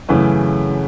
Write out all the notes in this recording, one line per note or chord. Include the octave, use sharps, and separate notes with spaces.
F#2 C#3 E3 A3